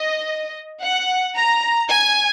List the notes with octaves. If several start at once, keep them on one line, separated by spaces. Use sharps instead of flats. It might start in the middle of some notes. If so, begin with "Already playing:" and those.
Already playing: D#5
F#5
A#5
G#5